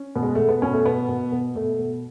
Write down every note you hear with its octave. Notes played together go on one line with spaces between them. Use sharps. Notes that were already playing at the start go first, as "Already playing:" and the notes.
Already playing: C#4
B2
G#3
B2 A3
B3
B2 C#4
A3
B2 B3
B2
B2
B2 A3
B2